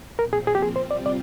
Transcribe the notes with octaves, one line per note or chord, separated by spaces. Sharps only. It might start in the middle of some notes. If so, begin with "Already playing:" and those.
A#2 F3 C4 A#4
G#4
G#4
G4
G#4
C3 G3 C4 F4 C5
D5
D5